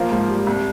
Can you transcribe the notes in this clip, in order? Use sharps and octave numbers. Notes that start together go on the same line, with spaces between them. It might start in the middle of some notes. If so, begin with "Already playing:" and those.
Already playing: F3 A#3
G#2
G3
C2